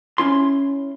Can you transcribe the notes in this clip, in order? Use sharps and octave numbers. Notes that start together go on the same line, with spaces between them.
C#4 E4 C6